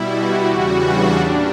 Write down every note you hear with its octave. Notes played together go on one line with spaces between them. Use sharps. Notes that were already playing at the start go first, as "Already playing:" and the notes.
Already playing: B2 G3 E4
F#4
E2 C#3 E3 G3 F#4
D4
A#2 G3